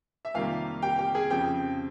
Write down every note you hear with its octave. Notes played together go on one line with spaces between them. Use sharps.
E5
F2 C3 D#3 G3 A#3 F4 F5
G4 G5
G4 G5
G#4 G#5
F2 C#3 F3 G4 G5